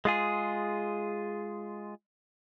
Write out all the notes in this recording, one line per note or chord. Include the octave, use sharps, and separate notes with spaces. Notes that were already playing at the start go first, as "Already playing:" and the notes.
G#3 F4 G#4